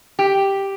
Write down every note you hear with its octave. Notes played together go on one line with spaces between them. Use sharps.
G4